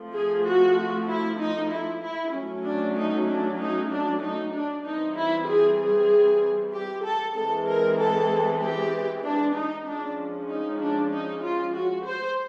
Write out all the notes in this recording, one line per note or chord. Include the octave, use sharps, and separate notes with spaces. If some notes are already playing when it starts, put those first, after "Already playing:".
Already playing: F3 A3 C4
G#4
F#4
E4
D#4
E4
E4
F#3 A3 C#4
D4
D#4
D4
D#4
D4
D#4
D4
E3 G3 C4 D#4
E4
G#4
G#4
G4
A4
E3 G#3 C4 A4
A#4
A4
G4
D4
D#4
F3 G#3 C#4 D4
D#4
D4
D#4
F4
F#4
C5